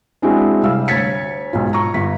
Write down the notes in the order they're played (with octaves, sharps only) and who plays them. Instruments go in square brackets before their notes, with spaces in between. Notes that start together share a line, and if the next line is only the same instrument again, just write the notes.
[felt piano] G#3 C4 D4 E4 F#4
C3 G3 F5 E6
D2 C#5 G#6 A6 B6 C#7
B1 G#2 F4
A#5 C#6
G1 B6